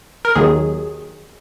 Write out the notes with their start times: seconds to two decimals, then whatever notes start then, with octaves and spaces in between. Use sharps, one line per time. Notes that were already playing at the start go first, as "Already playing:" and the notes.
0.25 A#4
0.35 D#2 D#3 F#3 G#4